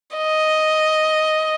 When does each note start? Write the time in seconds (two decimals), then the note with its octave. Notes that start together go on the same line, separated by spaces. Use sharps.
0.17 D#5